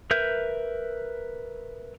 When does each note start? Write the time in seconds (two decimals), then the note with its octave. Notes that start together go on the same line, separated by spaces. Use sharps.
0.11 A#4 B4 E5 G6